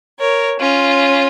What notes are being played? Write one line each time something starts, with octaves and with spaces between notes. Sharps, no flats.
A#4 C#5
C#4 F4